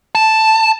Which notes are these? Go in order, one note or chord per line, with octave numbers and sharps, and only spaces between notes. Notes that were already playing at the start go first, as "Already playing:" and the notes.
A5